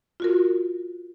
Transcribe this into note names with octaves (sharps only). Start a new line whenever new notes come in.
F4 F#4 A#4